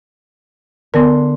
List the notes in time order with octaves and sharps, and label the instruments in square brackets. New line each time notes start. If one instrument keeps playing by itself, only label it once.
[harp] D3 C6 [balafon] B3 A#4